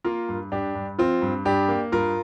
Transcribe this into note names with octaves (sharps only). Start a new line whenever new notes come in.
A#3 F4 A#4
G2
G2 D4 G4
G2
F3 C4 F4
G2
G2 D4 G4
A#3
G2 F4 A#4